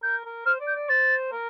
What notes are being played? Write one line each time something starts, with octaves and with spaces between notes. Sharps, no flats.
A#4 G6
A#4
C5 F6
D5
G6
D5
C5 A6
A#4